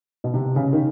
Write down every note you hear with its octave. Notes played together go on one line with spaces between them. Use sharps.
B2
C3
C#3
D#3